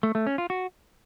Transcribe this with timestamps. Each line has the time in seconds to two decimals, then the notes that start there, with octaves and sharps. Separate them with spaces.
0.03 A3
0.15 A3
0.27 C#4
0.38 F4
0.50 F#4